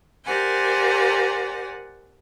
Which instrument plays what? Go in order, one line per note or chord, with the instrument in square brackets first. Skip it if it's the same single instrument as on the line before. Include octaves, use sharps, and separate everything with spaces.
[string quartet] G4 A#4 C5 D5 F#5 G#5